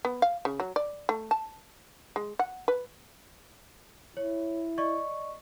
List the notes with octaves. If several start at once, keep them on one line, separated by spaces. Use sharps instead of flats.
B3
F5
C#3
F#3
D5
A3
A5
G#3
F#5
B4
E4 C#5
D5 D#5 C#6